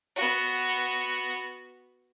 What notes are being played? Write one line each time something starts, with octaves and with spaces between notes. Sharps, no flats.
B3 F#4